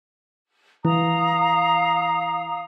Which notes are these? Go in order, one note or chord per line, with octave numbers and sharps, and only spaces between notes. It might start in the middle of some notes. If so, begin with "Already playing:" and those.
E3 F5 A#5 D#6